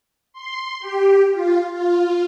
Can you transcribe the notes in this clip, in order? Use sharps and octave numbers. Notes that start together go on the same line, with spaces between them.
C6
G4
F4
F4